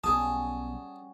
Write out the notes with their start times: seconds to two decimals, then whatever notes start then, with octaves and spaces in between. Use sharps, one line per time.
0.04 B1 G3 C#4 F#4 G#4 A5 D#6